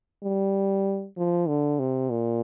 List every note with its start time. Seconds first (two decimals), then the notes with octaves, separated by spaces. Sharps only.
0.23 G3
1.17 F3
1.48 D3
1.79 C3
2.10 A#2